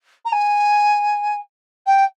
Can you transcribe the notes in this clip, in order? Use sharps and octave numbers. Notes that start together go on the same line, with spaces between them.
A#5
G#5
G5